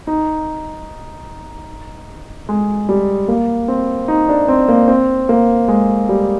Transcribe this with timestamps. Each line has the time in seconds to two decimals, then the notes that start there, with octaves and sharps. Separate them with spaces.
0.07 D#4
2.49 G#3
2.89 G3
3.28 A#3
3.68 C4
4.08 D#4
4.29 D4
4.48 C4
4.68 A#3
4.88 C4
5.29 A#3
5.68 G#3
6.09 G3